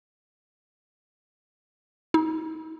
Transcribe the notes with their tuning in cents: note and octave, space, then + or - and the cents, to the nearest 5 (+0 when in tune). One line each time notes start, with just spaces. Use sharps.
D#4 +35